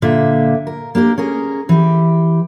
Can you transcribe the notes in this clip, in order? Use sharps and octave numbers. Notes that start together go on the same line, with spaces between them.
A#2 D3 A#3 E5
A#4
A#3 D4 G4 A#4
C#4 G#4 A#4
E3 G4